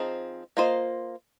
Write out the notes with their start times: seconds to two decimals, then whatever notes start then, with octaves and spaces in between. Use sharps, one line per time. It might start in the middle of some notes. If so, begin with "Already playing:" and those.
Already playing: F3 C4 D#4 G#4
0.57 A#3 F4 C5 D#5